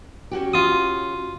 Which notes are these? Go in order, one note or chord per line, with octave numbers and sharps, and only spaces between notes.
C#4 F#4 G4
F4 D#6